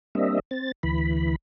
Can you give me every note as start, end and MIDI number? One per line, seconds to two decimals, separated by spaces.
0.15 0.40 55
0.15 0.40 58
0.15 0.40 60
0.15 0.40 62
0.15 0.40 75
0.15 0.40 76
0.51 0.72 60
0.51 0.72 93
0.83 1.36 38
0.83 1.36 52
0.83 1.36 83